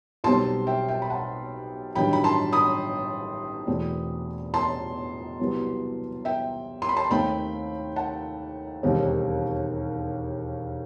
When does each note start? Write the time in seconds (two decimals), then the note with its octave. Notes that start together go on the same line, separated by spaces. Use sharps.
0.24 B1 B2 G3 C4 A5 C6
0.67 E5 G5
0.88 E5 G5
1.02 B5
1.10 F#5 A5
1.95 A1 G2 D#3 F#3 G5 B5
2.13 B5
2.24 A5 C6
2.53 B5 D#6
3.67 E2 B2 A3 C4
4.54 A5 C6
5.40 C2 C3 F#3 B3
6.25 E5 G5
6.82 C6
6.89 B5
6.96 A5 C6
7.10 D#2 D#3 A3 C4 G5 B5
7.96 F#5 A5
8.83 E1 D#2 D#3 G3 C4